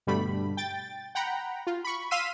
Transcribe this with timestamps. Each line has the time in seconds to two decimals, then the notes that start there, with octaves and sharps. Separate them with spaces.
0.07 G2 B2 D3 G3 A3 B5
0.57 G5 A6
1.15 F#5 G5 A#5 B5
1.67 F4
1.84 B5 C#6
2.11 F5 C6 E6 F6 B6 D#7